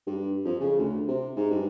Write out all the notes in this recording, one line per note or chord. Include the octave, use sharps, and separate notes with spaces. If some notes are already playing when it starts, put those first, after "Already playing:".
G2
F2
C#3
D2
C3
G#2
G2